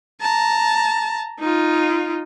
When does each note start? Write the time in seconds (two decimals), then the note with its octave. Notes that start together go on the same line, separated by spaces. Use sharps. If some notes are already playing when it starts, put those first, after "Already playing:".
0.21 A5 A#5
1.40 D#4 F4